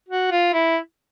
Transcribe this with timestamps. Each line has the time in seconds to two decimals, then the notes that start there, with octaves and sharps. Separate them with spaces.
0.09 F#4
0.32 F4
0.54 E4